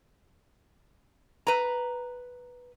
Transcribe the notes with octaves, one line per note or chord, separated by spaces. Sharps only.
B4 A#5